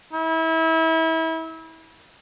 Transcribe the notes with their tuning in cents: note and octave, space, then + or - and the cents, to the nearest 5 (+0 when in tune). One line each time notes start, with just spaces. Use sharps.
E4 -30